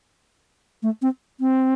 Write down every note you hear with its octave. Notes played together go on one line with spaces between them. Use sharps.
A3
C4
C4